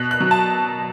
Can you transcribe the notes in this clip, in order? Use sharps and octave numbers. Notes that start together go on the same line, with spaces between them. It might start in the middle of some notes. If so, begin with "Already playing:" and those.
Already playing: B2 F#6
F#6
F#3
A5